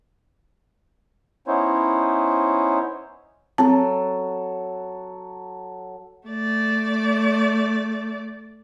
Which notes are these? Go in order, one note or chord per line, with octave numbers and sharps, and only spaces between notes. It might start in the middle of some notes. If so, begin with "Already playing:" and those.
B3 C#4 D#4 E4 C5 C#5
F#3 C4 A4 A5
A3 D5